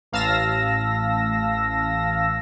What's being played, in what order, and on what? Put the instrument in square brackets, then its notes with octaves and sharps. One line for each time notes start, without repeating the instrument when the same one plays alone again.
[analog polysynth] A1 F5 A5 E6 A#6